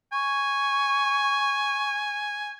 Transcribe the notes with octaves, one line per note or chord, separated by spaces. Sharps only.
G#5 C#6